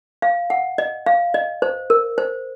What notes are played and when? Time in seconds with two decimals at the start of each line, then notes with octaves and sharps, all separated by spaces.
0.22 F5
0.50 F#5
0.78 D#5
1.06 F5
1.34 D#5
1.62 C5
1.90 A#4
2.18 C5